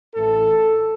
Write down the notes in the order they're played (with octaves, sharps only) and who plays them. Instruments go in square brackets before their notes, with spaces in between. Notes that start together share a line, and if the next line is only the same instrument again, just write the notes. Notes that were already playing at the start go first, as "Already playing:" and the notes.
[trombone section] A1 A2 E3 A4